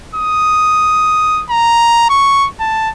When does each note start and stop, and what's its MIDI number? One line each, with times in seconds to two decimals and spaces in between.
0.15 1.44 87
1.50 2.07 82
2.10 2.48 85
2.60 2.90 81